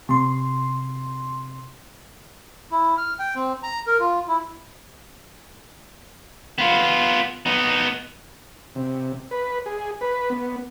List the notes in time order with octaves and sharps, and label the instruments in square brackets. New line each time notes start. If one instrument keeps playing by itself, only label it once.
[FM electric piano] C3 C6
[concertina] E4
F6
G5
C4
A#5
A#4
F4
E4
[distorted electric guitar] B3 F4
B3 D#4
[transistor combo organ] C3
B4
G#4
B4
B3